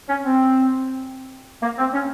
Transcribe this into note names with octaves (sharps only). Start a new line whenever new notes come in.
C#4
C4
A#3
C4
C#4